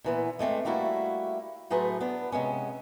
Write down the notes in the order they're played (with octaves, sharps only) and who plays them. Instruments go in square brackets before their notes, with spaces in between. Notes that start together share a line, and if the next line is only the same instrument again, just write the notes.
[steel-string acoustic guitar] A#2 E3 B3
G#3 A3 C4 D4
G3 A3 A#3 E4 F#4
A2 F#3 A3 G#4 B4 C5
B3 D4
C3 G#3 B3 C#4